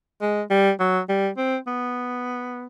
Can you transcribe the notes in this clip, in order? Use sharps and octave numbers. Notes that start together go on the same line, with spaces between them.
G#3
G3
F#3
G3
C4
B3